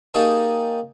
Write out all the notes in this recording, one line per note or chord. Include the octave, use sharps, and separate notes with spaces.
A#3 D#4 G4 G#4 C#5 A5